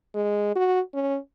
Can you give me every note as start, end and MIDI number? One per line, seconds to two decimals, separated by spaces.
0.15 0.54 56
0.56 0.80 66
0.94 1.18 61